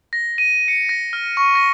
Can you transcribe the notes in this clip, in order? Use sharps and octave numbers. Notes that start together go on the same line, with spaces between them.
A#6
D#7
C#7
A#6
F6
C#6
A#6